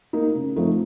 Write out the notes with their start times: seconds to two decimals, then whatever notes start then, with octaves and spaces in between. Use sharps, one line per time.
0.13 A#3 D#4
0.35 C#3
0.56 F3 A3 C4 D#4